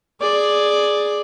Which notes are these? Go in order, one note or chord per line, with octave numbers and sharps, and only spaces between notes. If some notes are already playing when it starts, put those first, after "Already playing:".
G#4 D5